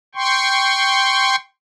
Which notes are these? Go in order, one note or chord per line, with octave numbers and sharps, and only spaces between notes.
G5 C6 C#6